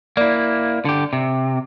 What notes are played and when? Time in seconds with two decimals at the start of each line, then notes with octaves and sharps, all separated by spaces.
0.17 A#3 E4 D5
0.85 D3 G4
1.13 C3